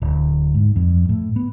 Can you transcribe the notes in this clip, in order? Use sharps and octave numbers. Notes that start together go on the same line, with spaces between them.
D1
G#2
F2
A2
B3